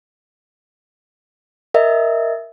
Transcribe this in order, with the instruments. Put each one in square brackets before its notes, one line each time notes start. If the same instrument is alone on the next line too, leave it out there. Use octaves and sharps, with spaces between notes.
[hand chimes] A#4 D#5 E5